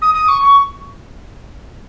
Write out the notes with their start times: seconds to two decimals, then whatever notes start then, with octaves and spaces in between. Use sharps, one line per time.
0.01 D#6
0.13 D#6
0.28 C#6
0.41 C#6